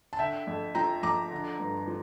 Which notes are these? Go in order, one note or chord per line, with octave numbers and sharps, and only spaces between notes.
A5
D3 E5 G5
F2
F3 G5 A#5
F2 A#5 D6
D3
G2
F3